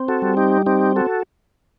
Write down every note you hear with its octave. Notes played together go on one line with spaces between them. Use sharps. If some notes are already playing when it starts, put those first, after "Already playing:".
Already playing: C4
F#4 A4
G3
D#4 G4
C4 D#4 G4
F#4 A4